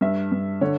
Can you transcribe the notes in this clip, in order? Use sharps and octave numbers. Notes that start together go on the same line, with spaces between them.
G2 E5
G2
D3 C#5